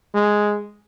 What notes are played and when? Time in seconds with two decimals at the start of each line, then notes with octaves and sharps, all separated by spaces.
0.14 G#3